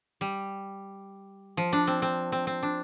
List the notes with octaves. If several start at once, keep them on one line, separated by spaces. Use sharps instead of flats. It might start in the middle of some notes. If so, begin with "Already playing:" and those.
G3
F3
D4
C4
C4
C4
C4
D4